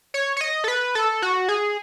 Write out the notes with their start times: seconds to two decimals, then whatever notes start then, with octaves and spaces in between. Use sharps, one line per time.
0.14 C#5
0.37 C#5
0.41 D#5
0.64 A4
0.68 B4
0.95 A4
1.22 F#4
1.49 G#4